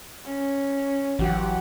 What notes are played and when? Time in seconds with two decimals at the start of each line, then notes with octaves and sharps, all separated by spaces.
0.24 C#4
1.19 A1 E3 F#3 F#4 G4 F#5